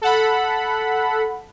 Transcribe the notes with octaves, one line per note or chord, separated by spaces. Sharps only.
A4 F#5 B5